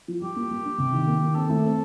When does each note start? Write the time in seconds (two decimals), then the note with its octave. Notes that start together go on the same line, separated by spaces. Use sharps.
0.08 F3
0.21 G3 G4
0.36 A#3
0.51 G3
0.65 D4
0.78 C3
0.93 D#3
1.07 A#3
1.21 D#3
1.35 C4 A4
1.50 A3
1.64 C4